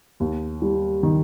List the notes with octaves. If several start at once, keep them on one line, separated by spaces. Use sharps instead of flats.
D#2
G3
D#3